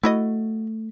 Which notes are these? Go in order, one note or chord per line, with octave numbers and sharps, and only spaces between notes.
A3 E4 F#4 D#5